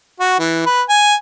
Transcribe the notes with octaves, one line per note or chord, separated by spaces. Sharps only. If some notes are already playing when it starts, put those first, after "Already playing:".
F#4
E3
B4
G#5